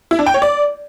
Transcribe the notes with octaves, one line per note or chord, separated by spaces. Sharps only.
E4
D4
G5
C#5
D5